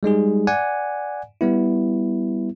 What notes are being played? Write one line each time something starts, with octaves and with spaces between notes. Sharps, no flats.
G3 G#3 D#4 G#4
D5 F#5 G#5
G3 B3 E4